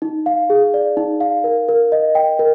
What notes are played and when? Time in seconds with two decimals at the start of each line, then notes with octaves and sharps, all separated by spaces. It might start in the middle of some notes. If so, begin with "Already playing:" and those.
0.02 D#4
0.26 F5
0.50 G#4
0.74 D5
0.97 D#4
1.21 F5
1.44 A#4
1.69 A#4
1.92 D#5
2.15 G5
2.39 A#4